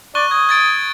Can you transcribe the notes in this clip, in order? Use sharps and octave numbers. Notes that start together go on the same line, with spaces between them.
D5 C#6 F#6 G7
D#6 G#6
G#6 A6 D7